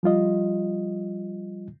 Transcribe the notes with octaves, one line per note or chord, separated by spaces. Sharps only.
F3 G3 F4 D#5